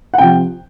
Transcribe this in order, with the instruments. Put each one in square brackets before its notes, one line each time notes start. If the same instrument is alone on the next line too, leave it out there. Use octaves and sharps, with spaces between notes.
[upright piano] F#5
C3 F3 G5